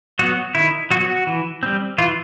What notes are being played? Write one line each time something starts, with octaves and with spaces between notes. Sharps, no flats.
F#3 B3 F#4
D#3 E4
F#3 B3 F#4
E3
G3 C4
E3 F4